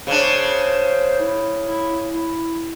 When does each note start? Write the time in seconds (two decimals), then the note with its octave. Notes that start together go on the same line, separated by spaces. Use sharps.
0.07 C#3 D4 C5
1.19 E4
1.66 E4
2.11 E4